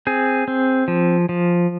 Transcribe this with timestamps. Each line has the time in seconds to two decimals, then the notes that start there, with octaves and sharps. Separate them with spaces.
0.07 C4 G#4
0.48 C4
0.88 F3
1.29 F3